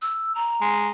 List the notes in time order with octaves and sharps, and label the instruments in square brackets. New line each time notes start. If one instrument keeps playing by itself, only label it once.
[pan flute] E6
A#5
[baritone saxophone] G#3